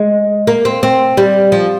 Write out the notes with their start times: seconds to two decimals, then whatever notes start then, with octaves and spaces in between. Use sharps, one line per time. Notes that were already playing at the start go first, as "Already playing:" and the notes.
Already playing: G#3
0.47 A#3
0.65 C4
0.83 C4
1.17 G3
1.52 F3